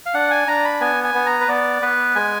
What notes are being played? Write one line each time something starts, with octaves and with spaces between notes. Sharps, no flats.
F5
D4 F#5
G#5
D4 A#5
B5
B3 G#5
G#5
B3
A#5
B4
B3 D5
B3 B4
G#3 G#5